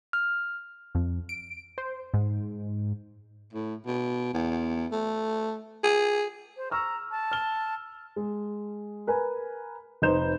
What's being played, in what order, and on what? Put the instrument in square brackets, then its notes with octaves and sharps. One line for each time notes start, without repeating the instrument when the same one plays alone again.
[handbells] F6
[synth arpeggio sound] F2
D7
C5
G#2
[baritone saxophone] A2
B2
E2
A3
G#4
[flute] C5
[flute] A#5 [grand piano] C#6 E6 F6
[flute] A5
[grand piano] F6 G7
[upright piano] G#3
A#4 B4 G#5
F1 D#4 B4 C5 G6 E7